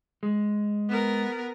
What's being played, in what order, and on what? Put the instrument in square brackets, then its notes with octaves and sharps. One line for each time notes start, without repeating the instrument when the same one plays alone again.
[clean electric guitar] G#3
[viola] B3 A#4